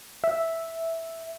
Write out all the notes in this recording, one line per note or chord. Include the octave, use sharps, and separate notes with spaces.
E5